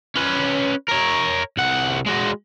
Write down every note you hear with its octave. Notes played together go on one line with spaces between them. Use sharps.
C#4 B4
A#4 C#5
C2 F#5
G#3 F#4